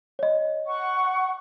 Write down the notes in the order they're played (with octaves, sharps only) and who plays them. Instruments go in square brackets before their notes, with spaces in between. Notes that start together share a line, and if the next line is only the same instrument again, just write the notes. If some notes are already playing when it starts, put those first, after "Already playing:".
[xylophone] C#5 D#5
[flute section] F#5 C#6